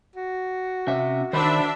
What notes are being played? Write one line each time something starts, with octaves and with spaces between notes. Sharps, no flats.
F#4
C3 C#4 E5
D#3 D4 C5 E5 B5